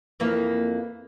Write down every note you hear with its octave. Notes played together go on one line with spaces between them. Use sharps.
F2 E3 A#3